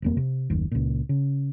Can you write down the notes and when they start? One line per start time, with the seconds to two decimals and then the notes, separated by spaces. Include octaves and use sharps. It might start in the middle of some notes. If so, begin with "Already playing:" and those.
0.02 D#1 F2 A#3
0.17 C3
0.50 F#1 D#2
0.72 C#2 A#2
1.09 C#3